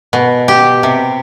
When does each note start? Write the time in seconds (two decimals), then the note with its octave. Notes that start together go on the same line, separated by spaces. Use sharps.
0.13 B2
0.48 G4
0.83 C3